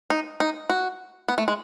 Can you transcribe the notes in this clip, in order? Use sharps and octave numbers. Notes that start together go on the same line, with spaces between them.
D#4
D#4
F#4
B3
A3
G#3